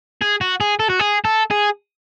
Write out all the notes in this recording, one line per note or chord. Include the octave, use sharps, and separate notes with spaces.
G#4
F#4
G#4
A4
F#4
G#4
A4
G#4